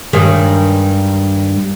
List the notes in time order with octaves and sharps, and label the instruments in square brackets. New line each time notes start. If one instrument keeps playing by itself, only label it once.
[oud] G2 D#3 G#3